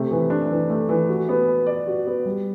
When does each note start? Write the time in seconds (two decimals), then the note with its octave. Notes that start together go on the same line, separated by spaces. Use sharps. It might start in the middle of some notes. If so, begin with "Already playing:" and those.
Already playing: C3 A3
0.11 E3
0.30 D4
0.50 E3
0.70 A3
0.89 E3
1.09 F#4
1.29 B3
1.48 B4
1.66 D5
1.87 F#4
2.07 B3
2.25 G3